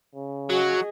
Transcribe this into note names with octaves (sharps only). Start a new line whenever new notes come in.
C#3
F#3 F#4 G#4 D#5